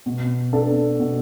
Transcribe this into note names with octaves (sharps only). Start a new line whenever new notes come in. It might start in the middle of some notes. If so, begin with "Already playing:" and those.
B2
B3 D4 A4
B2